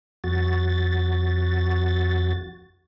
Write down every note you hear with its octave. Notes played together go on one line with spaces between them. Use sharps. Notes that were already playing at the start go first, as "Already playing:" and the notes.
F2 F#4 A6